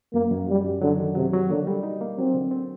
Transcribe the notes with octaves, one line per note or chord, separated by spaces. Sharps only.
F#2 A#3
F#2
F#3 G3
F#2
D3 F#3
D#3
C3 F#3
F#3
D3 A#3
G3
D#4
A#3
F#3 C4
D3
C4